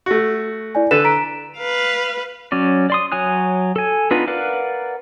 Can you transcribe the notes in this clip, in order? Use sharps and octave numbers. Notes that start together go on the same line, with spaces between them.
A3 F#4
E4 D5 G#5
D3 A4 B4 E7
A#5 B6 D7
B4 F5
F#3 C#4 D5
D5 C6 D#6
F#3 C#5 G#5 D#6 F#6
A4 G#5
B3 D4 D#4 F4 B4
A#4 B4 D5 F5 F#5